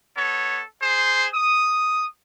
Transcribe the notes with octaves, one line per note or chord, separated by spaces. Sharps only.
B3 A4 C#5
G#4 C5
D#6